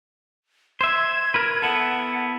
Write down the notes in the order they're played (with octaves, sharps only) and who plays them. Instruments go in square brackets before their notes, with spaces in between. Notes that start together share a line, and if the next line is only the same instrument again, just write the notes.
[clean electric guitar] C5 E5 [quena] G#6
[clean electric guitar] A#4 B4
[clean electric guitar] B3 E4 A4 [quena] F#5